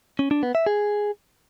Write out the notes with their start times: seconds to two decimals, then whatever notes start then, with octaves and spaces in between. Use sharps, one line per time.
0.19 C#4
0.31 D4
0.43 B3
0.55 E5
0.66 G#4